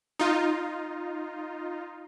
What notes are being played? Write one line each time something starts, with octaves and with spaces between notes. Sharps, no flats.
D#4 F4